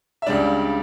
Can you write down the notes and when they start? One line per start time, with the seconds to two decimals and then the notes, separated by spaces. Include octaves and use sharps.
0.22 E5
0.26 C#2 C#3 G3 D4 D5